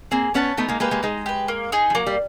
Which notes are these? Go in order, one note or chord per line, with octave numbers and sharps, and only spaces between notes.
A#3 C4 G#4
B3 C#4 C#5 F#5 A5
A3 B3 D#4
G#3 A#3
G#3 A#3 G4 B4
G#3 A#3
G#3 D#4
G4 B4
A#3
D#4 G#4
F3
F#3 A#3
G3